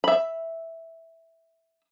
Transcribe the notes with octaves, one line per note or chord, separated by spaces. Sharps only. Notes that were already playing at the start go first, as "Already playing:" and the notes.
E5 B5